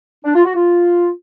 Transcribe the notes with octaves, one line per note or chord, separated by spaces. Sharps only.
D4
F4
F#4
F4